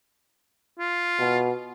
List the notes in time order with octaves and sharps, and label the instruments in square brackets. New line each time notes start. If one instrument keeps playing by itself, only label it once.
[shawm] F4
[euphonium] B2